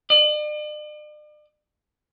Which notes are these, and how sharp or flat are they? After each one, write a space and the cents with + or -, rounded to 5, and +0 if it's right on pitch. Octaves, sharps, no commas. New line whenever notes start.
D5 +45